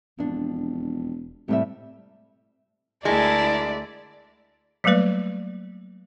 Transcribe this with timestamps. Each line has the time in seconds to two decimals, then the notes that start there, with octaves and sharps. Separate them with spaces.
0.19 E1 F2 D4
1.48 A2 C3 G3 E5
3.05 D2 G#3 E4 G#4 A#4 D5 A5
4.84 F#3 G3 A3 A#3 B4 D5